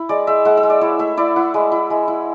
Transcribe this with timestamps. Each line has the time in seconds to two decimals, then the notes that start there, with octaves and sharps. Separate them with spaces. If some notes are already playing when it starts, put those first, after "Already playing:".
Already playing: E4
0.09 G#3 D5
0.27 G#3 E5
0.45 G#3 F#5
0.57 E5
0.63 G#3
0.70 D5
0.81 E4 C#5
0.99 A3 E5
1.17 E4 D5
1.36 E4 F#5
1.54 G#3
1.72 E4
1.90 G#3
2.08 E4